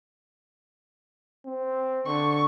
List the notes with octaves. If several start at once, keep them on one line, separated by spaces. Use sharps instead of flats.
C4
D3 C#6